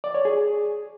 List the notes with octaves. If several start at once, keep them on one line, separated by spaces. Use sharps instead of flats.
D5
C#5
G#4